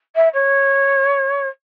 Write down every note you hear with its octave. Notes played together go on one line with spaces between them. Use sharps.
E5
C#5